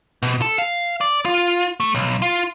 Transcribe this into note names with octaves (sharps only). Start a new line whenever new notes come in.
B2
A4
F5
D5
F4
A3
B1
F4